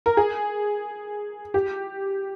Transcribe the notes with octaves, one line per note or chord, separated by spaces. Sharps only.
A#4
G#4
G4